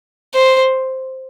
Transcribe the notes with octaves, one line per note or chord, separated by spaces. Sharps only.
C5